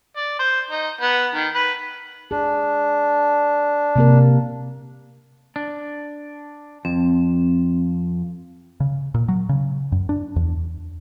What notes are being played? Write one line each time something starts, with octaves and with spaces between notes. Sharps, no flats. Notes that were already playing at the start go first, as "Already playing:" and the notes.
D5
C5
D#4
B3
D#3
B4
D4 G#4
C3 A#3 A#4
D4
F2 C4
C#3
A#2
F#3
C#3
F#2
D4
E2